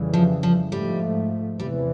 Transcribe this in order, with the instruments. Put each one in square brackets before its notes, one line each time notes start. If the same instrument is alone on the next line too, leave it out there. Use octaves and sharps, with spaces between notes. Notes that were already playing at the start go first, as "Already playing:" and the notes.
Already playing: [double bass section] F2 C#3 E3 G3
[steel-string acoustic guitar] F3
F3
[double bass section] G#2 F3 A3 [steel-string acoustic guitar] G3
[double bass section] E2 C3 E3 [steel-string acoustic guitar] G3